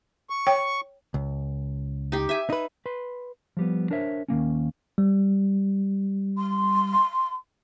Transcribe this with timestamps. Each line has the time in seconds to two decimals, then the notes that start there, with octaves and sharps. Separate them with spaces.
0.30 C#6
0.47 C#5 G5
1.14 C#2
2.12 D#4 G4
2.29 E5 G#5
2.50 D#4 B4
2.86 B4 B5 C6
3.57 F3 G3 B3
3.91 D4 A#4 C5 C#5 E5
4.28 D#2 D3 A#3 C#4
4.98 G3
6.37 C6